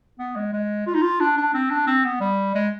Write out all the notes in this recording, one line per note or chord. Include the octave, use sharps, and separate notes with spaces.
B3
G#3
G#3
F4
D#4
F4
D4
D4
C4
D4
C4
B3
G3
G#3